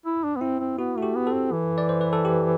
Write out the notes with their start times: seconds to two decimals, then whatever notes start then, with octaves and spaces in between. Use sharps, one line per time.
0.06 E4
0.24 D4
0.36 B3
0.41 C4 E4
0.60 C4
0.78 B3 F#4
0.97 A3 F#4
1.02 G4
1.15 B3
1.27 A4
1.33 C4
1.52 E3
1.78 D5
1.89 C5
2.01 B4
2.13 A4
2.25 G4